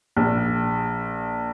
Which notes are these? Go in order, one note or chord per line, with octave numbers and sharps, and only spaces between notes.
A#1